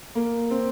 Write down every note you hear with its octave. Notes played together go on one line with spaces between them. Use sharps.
A#3
C4